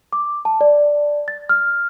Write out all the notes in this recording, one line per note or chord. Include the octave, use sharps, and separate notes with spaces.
D6
A5
D5
A6
F6